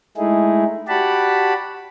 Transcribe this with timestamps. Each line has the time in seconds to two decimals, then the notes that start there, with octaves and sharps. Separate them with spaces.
0.18 G#3 A3 D#4 E4 G#4
0.88 F#4 G4 D5 F#5 A5 B5